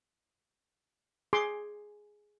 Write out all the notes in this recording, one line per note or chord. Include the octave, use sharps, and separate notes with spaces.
G#4 C6 D6